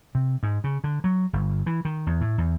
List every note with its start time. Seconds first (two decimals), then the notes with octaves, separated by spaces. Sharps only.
0.15 C3
0.43 G#2
0.64 C#3
0.84 D3
1.04 F#3
1.33 G1
1.66 E3
1.85 D#3
2.07 E2
2.21 A2
2.38 E2